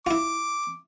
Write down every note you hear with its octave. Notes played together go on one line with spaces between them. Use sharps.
E4 F4 D6